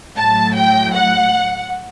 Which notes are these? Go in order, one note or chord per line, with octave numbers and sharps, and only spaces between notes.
A2 F#3 A5
G5
F#5